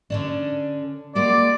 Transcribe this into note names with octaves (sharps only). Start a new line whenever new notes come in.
D3 C#4 D4
G#3 A#3 F#4 D5